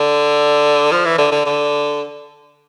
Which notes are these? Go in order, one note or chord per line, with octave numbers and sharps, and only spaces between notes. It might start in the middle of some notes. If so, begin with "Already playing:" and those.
Already playing: D3
F3
E3
D3
D3
D3